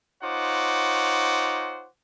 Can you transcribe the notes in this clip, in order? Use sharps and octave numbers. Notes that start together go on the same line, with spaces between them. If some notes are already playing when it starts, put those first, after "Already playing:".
D#4 F4 C5 C#5 F#5 D6